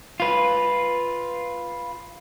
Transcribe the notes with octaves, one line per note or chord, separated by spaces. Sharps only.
F4 B4